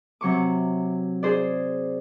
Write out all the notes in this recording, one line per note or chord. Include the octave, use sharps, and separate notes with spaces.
C3 F#3 C#6 D6
G#4 C5 D5